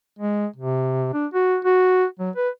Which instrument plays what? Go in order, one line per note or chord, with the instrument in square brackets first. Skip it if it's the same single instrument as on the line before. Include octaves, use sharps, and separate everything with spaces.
[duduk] G#3
C3
D4
F#4
F#4
F#3
B4